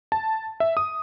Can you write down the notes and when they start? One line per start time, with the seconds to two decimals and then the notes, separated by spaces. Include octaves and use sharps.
0.12 A5
0.60 E5
0.77 D#6